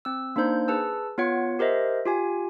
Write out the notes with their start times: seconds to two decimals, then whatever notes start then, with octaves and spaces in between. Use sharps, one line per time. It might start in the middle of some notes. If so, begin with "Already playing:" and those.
0.05 C4 E6
0.36 A#3 D4 D#4 C5 G6
0.68 G#4 B4 A5 E6
1.18 B3 F4 C#5 F#5
1.59 G4 A#4 C5 D#5 E5
2.06 F4 G4 G#5